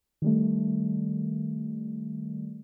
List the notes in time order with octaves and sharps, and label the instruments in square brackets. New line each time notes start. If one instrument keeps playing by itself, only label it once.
[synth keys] D#3 G3 A3